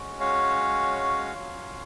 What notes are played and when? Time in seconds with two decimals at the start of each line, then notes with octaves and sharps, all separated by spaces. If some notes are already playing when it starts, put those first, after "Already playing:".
Already playing: G#3 C#4 F#4
0.20 C#5 F5
1.34 F#3 C#4 F4